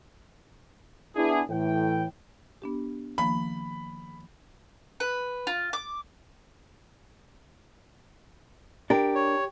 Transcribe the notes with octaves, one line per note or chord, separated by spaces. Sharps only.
B3 D4 E4 G#4
A2 E3 G5
B3 D4 G4
D#3 F3 A#3 B5
B4
F4
D6
D4 G4 A#4
C#5